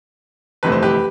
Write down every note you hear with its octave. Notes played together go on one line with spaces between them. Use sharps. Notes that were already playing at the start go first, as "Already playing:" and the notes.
G1 F2 C3 E3 A3 B4
C5
G4 B4